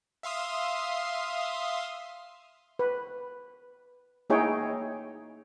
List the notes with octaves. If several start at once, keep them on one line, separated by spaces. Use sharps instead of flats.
E5 F5 C6 D#6
B4
A#3 D#4 E4 G#4 C#5 G5